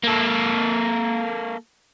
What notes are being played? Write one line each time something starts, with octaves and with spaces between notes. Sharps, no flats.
A#3 A4